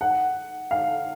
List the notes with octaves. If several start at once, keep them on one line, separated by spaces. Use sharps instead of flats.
F#5
F5